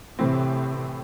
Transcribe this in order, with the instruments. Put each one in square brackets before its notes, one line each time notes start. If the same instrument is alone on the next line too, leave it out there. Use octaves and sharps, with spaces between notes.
[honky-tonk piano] A2 E3 C4 [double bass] C3